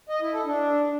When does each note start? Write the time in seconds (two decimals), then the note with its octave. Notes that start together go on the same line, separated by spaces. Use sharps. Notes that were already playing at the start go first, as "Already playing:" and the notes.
0.09 D#5
0.21 E4
0.33 A4
0.45 D4